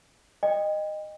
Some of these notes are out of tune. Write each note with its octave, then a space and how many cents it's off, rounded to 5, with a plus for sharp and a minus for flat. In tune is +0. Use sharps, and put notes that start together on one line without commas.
D#5 -15 G5 +30